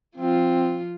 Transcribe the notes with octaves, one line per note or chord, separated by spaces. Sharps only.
F3 C4 F4